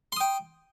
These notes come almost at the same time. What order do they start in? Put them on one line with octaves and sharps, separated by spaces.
C6 D#6 G5